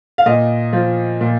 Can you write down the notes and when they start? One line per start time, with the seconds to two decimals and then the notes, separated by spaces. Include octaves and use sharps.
0.18 F5
0.26 A#2 D#5
0.73 F3
1.21 A#2